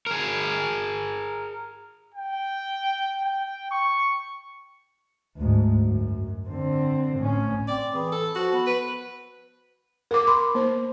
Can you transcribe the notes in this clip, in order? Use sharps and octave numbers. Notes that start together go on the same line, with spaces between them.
G#4 A#4
G5
G5
C#6
D2 G#2
F#2
D3 C4
A2 C#4
C4 D5
E3 G#4
A4
F3 F#4
B3
B4
A#4 D6
B5 C6
A#3 C5